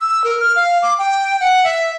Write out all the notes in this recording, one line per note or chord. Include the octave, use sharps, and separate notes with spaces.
E6
A#4
F6
F5
D6
G5
F#5
E5